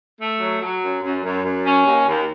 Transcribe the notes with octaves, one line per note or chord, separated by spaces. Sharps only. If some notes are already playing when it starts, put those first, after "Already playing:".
A3
F#3
F#3
F#2
F#2
F#2
F#2
C#4
D#2
D#2